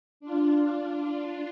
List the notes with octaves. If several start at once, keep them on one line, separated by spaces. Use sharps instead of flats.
D4 F4